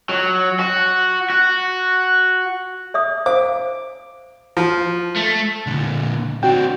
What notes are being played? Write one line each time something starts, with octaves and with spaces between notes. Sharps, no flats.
F#3
F#4
F#4
D5 E5 D#6
C5 F5 D6
F3
A3
A#2 D3
C4 D4 F#4 G5